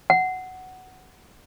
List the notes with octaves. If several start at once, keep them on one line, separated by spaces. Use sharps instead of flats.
F#5